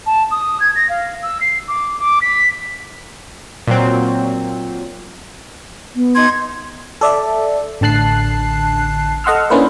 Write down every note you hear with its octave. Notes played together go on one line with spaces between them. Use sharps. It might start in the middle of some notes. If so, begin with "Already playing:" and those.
A5
D#6
G#6
A#6
F5
E6
C7
D6
D6
B6
A#2 F#3 C4
B3
D#4 C6 G#6
A4 D5 E5
A1 D3 A5 F#6 C7
A4 D#5 F#5 C6 E6 F6
A#3 C#4 D4 E4 B4 C5